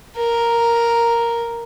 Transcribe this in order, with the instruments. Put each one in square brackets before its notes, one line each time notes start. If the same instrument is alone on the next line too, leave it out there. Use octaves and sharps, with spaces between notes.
[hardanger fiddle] A#4